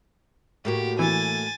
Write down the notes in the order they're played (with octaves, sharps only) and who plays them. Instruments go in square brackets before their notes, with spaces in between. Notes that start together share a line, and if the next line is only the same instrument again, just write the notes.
[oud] A2 A#3 F#4 [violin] G4
[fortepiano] E3 [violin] G#5 A6